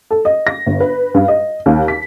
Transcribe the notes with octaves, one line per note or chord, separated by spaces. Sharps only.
A4
D#5
A#6
G1
B4
G2
D#5
D#2
B6